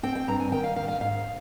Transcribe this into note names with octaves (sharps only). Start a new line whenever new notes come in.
C4 G5
G5
G2 A#5
G#5
D#3 G5
F5
D#3 F5
F5
G#2 F5